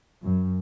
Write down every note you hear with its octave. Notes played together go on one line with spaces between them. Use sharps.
F#2